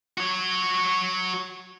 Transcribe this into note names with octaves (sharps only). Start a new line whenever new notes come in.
F#4 C#5